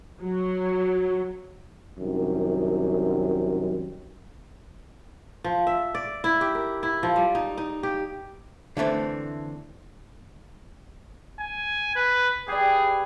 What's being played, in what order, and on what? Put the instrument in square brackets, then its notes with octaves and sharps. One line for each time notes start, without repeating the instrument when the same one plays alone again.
[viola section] F#3
[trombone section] C2 F#2 D#3
[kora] F3
E5
D5
E4
G4
A#4
E4
F3
G3
D#4
D#4
G4
[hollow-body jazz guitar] D3 E3 A3 C4
[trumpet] G#5
B4
[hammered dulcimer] G4 B4 D5 [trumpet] G#4